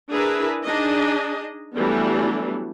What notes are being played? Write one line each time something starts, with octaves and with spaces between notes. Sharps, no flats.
D4 E4 G#4 A#4 B4 E5
D4 D#4 G#4 D#5
E3 F#3 G3 A3 B3 D4